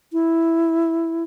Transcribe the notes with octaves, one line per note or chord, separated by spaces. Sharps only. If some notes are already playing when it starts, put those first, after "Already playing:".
E4